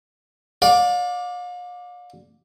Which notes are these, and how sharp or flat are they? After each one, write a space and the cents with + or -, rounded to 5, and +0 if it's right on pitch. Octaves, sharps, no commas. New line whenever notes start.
D5 +0 F5 +40